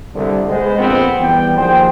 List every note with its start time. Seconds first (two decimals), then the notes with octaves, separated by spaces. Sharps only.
0.14 C2 D3
0.48 G#3 B3 C5
0.77 A#1 F2 B3 C4
1.19 E2 G3 B3 G5
1.58 D#2 F3 G#4 C5 G5